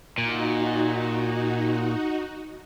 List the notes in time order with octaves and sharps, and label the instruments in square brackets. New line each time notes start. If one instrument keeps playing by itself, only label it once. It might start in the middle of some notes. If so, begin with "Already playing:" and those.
[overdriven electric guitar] A#2 [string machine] D#4 F#4